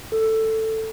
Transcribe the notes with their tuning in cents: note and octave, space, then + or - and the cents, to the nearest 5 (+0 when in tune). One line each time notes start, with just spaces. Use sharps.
A4 +10